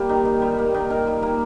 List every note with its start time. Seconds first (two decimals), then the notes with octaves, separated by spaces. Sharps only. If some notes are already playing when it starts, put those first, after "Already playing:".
Already playing: G3 A#3 G4
0.09 D#3
0.25 D#3
0.42 G3
0.58 A#3
0.74 D#3
0.90 D#3 A#4
1.07 G3
1.23 A#3